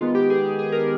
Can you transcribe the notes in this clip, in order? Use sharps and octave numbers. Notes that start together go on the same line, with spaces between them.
D#3 G#3 B3 F4
G4
G#4
G#4
A#4